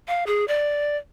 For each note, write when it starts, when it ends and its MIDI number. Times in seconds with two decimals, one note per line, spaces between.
0.08 0.24 77
0.27 0.47 68
0.48 0.97 74